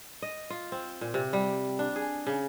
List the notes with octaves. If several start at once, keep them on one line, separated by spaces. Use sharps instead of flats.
D#5
F4
C4
A#2
C3
G3
D4
G#4
C#3